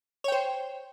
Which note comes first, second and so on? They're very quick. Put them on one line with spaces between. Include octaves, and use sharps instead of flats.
C#5 G5 C5